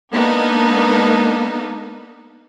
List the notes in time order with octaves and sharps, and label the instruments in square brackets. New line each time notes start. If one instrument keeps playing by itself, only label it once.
[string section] G#3 A#3 B3 D4 D#4 A4